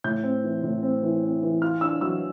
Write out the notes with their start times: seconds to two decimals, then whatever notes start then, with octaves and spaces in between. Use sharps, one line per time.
0.04 A2 G6
0.23 C4
0.44 E3
0.63 A2
0.82 C4
1.03 E3
1.23 C4
1.43 E3
1.62 F4 F6
1.81 D4 E6
2.01 F#3 E6